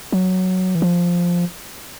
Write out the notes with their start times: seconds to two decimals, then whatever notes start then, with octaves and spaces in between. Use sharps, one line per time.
0.12 F#3
0.75 E3
0.82 F3